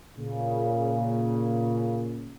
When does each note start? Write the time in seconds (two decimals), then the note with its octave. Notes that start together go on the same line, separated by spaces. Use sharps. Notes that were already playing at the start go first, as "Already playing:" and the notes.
0.17 A#2 C#3